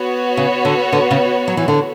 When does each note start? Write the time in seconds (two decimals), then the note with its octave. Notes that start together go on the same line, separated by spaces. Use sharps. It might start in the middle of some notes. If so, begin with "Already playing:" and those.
Already playing: B3 F#4 C#5
0.37 C#3
0.65 D3
0.92 D3
1.11 C#3
1.48 F#3
1.57 E3
1.68 D3